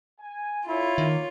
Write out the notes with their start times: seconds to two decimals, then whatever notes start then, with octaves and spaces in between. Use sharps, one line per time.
0.19 G#5
0.68 D3 E4 F4 C#5
0.98 D#3 A#3